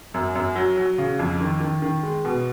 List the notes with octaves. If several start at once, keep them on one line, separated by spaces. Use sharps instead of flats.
F#2
F#2
F#3
F#3
C#3
F2
D#3
D#3
D#3
G#3
B2